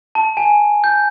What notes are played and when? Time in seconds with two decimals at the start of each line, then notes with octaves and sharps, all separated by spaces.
0.15 A5
0.37 G#5
0.84 G6